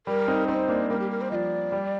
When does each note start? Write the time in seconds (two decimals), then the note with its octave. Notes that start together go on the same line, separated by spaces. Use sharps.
0.07 G3 A#4
0.28 C4 D#4
0.48 C4 D#4 C5
0.68 A#3 D4
0.90 G3 A#3 A#4
1.00 G4
1.10 A#4
1.21 C5
1.31 F3 D5 D#5
1.72 G3